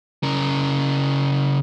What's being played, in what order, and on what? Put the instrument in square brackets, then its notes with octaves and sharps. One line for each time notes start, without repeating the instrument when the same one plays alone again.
[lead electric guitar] C#3 A#4